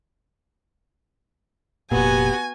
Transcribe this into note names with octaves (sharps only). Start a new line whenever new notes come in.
F1 A#2 B3 F#4 G4 G#5